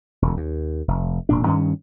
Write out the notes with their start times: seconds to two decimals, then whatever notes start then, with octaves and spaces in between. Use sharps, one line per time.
0.22 E1 D2
0.37 D#2
0.88 F1
1.29 E1 A#2 D4
1.46 G2 D#3 C#4